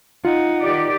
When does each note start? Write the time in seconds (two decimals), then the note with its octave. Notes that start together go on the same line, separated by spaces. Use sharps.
0.25 D#4 F4 F#5
0.62 D#3 G4 D5